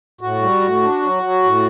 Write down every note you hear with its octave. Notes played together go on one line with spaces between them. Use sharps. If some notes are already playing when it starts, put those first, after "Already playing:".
A2 F#4
G3
A2
D4
F#3
F#3
A2